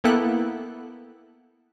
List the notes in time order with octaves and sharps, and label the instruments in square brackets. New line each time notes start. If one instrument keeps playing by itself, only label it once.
[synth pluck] A#3 B3 E4 A4 G5 F#6